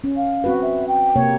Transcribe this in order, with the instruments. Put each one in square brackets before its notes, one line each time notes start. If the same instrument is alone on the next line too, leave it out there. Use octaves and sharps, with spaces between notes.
[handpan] C#4
[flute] F5
[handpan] C4 F#4 B4
[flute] E5
G5
[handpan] C3 A#3 C#5